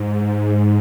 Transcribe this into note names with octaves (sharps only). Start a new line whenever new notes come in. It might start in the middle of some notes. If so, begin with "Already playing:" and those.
Already playing: G#2